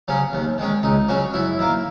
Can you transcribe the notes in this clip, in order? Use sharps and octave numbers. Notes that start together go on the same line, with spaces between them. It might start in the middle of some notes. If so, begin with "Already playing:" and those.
C#3 F#3 C#4
D#2
D#3 G#3 C#4
C#2 D#4
C#3 F#3 C#4 F#4
F#2 E4
D#3 A#3